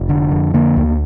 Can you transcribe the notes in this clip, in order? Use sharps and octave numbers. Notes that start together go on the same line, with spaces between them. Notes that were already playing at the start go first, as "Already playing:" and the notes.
Already playing: F1
D3
F2
D3 A#3
D2